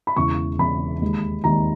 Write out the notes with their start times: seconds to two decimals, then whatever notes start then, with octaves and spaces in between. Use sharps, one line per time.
0.07 B5
0.16 E1 E2 C#3 E3 C#6
0.59 E1 E2 C#3 E3 B5
1.01 D#2 D#3 G#3
1.44 D#2 D#3 G#3 A#5